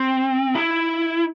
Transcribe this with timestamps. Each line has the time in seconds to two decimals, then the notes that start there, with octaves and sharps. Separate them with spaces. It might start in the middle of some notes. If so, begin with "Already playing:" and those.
Already playing: C4
0.55 E4